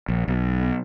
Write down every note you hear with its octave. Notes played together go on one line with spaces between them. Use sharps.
A#1
B1